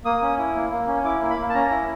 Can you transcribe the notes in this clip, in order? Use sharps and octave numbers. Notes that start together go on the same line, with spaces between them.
A#3 D#6
C#4
E4
A#3
A#3
C#4
E4 D6
A#3
B5
A#3
A5
C#4 A#5
E4